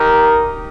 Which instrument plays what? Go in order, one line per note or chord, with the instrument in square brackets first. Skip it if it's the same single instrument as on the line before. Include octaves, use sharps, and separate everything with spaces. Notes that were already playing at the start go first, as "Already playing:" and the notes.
Already playing: [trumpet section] D#4 G4 A#4